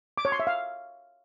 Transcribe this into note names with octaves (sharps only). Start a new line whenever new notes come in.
D6
C#5
C6
E5
F5